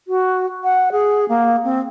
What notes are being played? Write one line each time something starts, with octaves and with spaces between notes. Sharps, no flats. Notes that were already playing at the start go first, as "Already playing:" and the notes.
F#4
F#5
G#4
A#3
C4